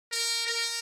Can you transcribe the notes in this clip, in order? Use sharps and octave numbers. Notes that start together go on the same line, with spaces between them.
A#4
A#4